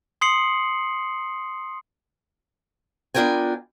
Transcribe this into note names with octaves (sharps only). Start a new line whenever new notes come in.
C6 D#6 C7 C#7 F#7
B3 D4 F4 A#4 G5 G#5